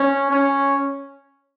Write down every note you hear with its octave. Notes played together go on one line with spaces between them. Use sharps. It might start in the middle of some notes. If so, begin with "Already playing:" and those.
Already playing: C#4
C#4